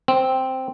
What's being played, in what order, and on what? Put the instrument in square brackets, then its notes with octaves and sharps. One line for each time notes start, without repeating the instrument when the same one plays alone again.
[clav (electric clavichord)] C4